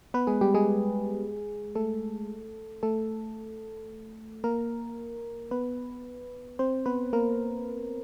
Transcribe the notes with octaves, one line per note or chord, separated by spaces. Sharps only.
B3 B4
G#3 G#4
G3 G4
G#3 G#4
A3 A4
A3 A4
A#3 A#4
B3 B4
C4 C5
B3 B4
A#3 A#4